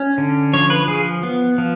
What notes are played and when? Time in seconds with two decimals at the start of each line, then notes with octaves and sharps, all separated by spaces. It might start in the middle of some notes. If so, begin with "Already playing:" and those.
Already playing: C#4
0.18 D3
0.53 F3 C#5
0.70 B4
0.88 F3 G#4
1.23 B3
1.58 F3